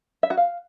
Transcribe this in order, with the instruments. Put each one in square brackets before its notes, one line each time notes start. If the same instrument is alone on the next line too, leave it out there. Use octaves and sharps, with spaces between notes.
[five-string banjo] E5
F#4
F5